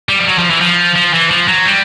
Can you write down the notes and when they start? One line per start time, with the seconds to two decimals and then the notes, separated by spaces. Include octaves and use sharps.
0.09 G3
0.19 F3
0.27 F#3
0.38 F3
0.51 E3
0.61 F3
0.96 F3
1.14 E3
1.30 F3
1.48 F#3
1.65 G3